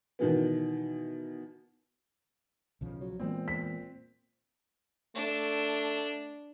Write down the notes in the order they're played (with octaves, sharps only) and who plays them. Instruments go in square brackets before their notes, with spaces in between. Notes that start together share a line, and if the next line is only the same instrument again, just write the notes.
[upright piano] B2 D#3 E3 B3
[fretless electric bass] B1 C#3 F3
[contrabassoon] F#3
[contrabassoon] A#2 [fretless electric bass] E3 G#3 B3 [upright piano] C4
[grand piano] B6
[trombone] A3 [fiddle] D4